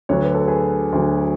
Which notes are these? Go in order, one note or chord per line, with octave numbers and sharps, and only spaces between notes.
D2 D3 F#3 C#5
B4
A4
G#4 B4
D2 D3 F#3